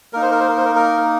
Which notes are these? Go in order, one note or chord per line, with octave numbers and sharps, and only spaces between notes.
A#3 D#4 A#4
C5
A#4
C5
A#4
C5
A#4
A#4